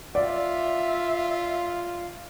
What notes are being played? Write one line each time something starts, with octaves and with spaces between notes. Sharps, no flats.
F4 D5 E5